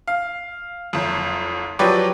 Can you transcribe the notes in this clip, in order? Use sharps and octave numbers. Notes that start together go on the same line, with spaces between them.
F5
F#1 F2
F3 F#3 G4 B4 C#5 D5